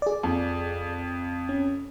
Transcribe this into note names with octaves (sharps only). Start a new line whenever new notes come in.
G#4 D5
F2
C#4